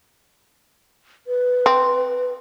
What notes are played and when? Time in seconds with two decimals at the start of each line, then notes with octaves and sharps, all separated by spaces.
1.27 B4
1.66 C4